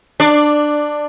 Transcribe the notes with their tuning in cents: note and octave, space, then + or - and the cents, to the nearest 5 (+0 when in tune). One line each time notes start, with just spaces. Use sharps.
D4 +15 D5 +0